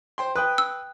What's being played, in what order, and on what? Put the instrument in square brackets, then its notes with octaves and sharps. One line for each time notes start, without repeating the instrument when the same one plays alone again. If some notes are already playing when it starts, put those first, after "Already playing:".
[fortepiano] C5 G5 C6
[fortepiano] B4 [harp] G5 D#6 F#6
[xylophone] E6